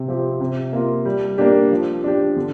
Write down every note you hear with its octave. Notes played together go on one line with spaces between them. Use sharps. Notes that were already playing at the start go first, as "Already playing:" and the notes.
Already playing: C3
F3 C4 G4
C3
A#3 F4
G3
A#3 D4 G4
F3
D4 G4
D3